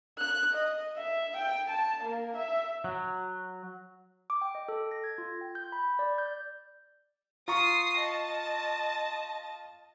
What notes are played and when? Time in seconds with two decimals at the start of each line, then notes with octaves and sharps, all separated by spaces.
0.18 F#6
0.53 D#5
0.97 E5
1.37 G5
1.70 A5
2.04 A#3
2.37 E5
2.84 F#3
4.30 D6
4.41 G5
4.55 D#5
4.68 A4
4.91 A#6
5.04 G#6
5.18 F4
5.41 G5
5.55 G6
5.72 B5
5.99 D5
6.18 G6
7.48 F4 A#5 C#6 D#6 C7
7.99 D#5 A5